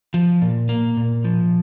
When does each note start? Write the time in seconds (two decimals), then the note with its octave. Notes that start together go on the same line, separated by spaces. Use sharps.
0.14 F3
0.42 A#2
0.69 A#3
0.97 A#2
1.24 F3